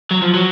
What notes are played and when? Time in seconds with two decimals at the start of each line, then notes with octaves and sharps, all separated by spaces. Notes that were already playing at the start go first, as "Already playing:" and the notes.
0.11 F#3
0.22 F3
0.34 F#3